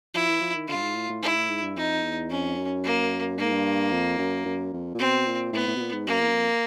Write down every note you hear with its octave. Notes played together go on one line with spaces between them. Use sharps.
F3 E4
E3
F3
D#3
D3 F4
G2
G#2
A2
A2
G#2 E4
A2
G#2
G2
F2 D#4
E2
F2 C#4
F#2
A#3
G2 A#3
G#2
G2
F2
F#2
F#2
F2
A#2
B2 C4
A#2
A2 B3
A2
B2
A#2
G#2
F#2 A#3
E2
F#2
F2